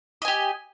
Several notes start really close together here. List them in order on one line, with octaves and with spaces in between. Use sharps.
D#5 G#5 G4